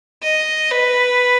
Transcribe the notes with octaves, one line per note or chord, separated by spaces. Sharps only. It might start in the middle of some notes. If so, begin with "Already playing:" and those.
D#5
B4